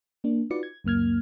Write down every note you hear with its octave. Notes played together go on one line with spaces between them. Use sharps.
A#3 D4
D#4 F4 F#4 B4 D5 C#7
G#6
C#2 F#2 A#3 F6 G#6